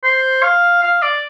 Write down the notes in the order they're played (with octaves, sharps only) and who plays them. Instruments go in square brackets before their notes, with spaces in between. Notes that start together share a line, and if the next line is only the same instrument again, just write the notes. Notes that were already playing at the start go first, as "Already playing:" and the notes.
[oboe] C5
F5
F5
D5